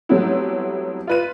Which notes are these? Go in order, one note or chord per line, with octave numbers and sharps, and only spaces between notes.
F#3 G3 A3 B3 C4 E4
F4 B4 D#7